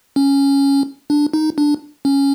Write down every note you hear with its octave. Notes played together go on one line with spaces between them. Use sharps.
C#4
D4
D#4
D4
C#4